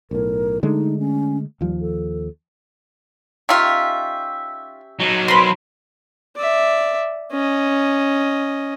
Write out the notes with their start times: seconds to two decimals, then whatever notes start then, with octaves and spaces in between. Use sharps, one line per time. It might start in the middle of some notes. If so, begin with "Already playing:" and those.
0.11 B1 A2 A#4
0.63 D3 G#3 A3 D#4
0.99 C#4
1.61 D#2 F3 G3
1.80 A4
3.49 D#3 C#4 F4 G4 E5
5.00 F#3 D#4
5.28 C4 A#4 B4 B5 C6
6.36 D5 E5
7.32 C#4 D#5